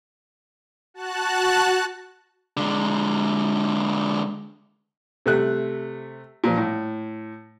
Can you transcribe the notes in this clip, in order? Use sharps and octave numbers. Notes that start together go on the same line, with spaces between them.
F#4 A5 F#6
D3 G#3
C3 A3 F#6
A#2 F3
A2